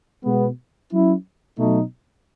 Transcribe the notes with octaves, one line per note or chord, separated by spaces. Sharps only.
B2 G#3 B3
F#3 C#4 E4
B2 F#3 A3 D#4